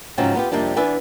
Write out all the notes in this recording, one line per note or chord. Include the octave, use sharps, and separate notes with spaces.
G#2 C#3 F3 F#3 C4 C#4
B3 F4 G4
F2 C3 G3 A#3 D4
E2 D4 B4 E5 G#5